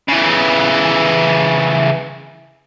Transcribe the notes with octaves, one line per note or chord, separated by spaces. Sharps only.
C#3 E3